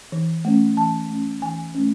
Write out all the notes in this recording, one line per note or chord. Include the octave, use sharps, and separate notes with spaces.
E3
A3 C#4
E3 A5
A3 C#4
E3 G#5
A3 C#4